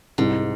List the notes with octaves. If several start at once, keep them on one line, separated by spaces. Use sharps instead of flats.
C2 G#2